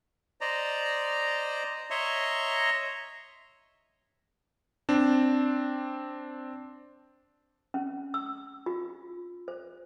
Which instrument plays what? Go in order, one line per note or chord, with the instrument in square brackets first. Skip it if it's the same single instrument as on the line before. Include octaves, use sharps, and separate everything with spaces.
[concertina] C5 D5 D#5 A#5
C#5 D#5 E5 A#5 C6 C#6
[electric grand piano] C4 D4
[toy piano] C#4
E6
F4
C5